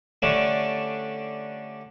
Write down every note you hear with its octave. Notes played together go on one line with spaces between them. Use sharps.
D3 G3 A3 C#4 D4